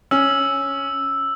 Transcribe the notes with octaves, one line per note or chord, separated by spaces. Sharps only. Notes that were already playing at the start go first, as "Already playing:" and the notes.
C#4 E6